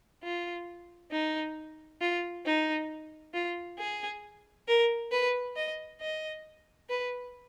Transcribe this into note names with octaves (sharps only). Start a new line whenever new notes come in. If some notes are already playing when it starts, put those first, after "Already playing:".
F4
D#4
F4
D#4
F4
G#4
A#4
B4
D#5
D#5
B4